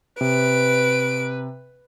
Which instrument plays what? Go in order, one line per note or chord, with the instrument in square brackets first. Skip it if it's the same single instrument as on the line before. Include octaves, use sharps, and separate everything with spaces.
[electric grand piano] C3 [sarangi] B4 [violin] D7